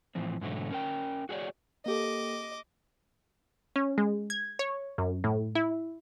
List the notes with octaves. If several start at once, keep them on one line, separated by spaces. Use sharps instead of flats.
A2 E3 F3 C4
G#2 B2 D3 E3 F#3 A3
C#4 A#4 G5
F#4 G#4 C#5 D5
A#3 G4 A4 D#5 D6
C#4
G#3
G#6
C#5
F#2
A2
E4